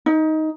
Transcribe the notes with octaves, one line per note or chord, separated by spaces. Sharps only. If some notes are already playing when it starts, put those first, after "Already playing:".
D#4